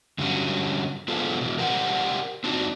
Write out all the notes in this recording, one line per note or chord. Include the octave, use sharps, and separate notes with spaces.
G2 D3 F#3 G3 C#4
B3 D4 F4 G#4 A4 C5
B2 E3
G4 A#4 C5 D5 F#5 G5
C4 D4 D#4 F#4 C5 D5